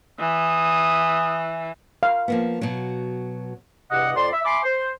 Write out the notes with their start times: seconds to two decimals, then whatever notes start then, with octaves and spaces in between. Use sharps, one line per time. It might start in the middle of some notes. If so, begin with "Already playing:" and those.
0.20 E3 D#6
2.03 F5
2.28 F3 A#3 B3
2.61 B2 F#3
3.91 E2 G2 C3 G4 D#5 F#5
4.16 F2 D5 C6
4.32 E5
4.45 E5 G#5 B5 C6 D6
4.64 C5